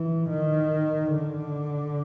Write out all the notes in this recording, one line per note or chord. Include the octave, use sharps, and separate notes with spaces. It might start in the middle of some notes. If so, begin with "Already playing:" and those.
Already playing: E3
D#3
D3